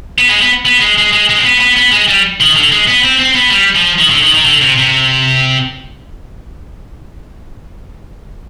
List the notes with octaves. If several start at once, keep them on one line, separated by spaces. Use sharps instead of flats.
B3
G#3
B3
B3
G#3
G#3
G#3
G#3
C4
B3
B3
B3
G#3
G3
D#3
D3
G#3
B3
C4
C4
B3
G3
F3
D#3
D3
D#3
D#3
D3
C3
C3